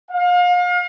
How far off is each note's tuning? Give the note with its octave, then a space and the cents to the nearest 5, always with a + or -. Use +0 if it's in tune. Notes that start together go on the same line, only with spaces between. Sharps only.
F5 +35